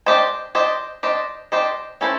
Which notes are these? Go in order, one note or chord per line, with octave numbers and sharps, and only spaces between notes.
D4 G4 C5 D#5
D4 G4 C5 D#5
D4 G4 C5 D#5
D4 G4 C5 D#5
C#4 E4 A4 C5